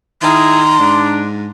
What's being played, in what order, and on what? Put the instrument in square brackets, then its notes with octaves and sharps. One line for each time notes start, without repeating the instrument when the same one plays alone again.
[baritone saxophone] D#3 [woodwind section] E4 G#4 [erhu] A#5 [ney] C6
[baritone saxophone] G#2 [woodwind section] D4